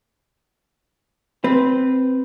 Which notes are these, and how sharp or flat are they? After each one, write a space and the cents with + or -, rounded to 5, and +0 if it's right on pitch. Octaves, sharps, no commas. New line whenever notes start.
C4 -10 B4 -5